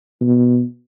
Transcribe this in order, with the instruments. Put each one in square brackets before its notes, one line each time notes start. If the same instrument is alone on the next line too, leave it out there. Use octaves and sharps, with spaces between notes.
[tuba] B2